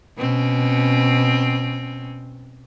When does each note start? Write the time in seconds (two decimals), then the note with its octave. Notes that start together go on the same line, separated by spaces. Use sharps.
0.17 B2 C4 C#4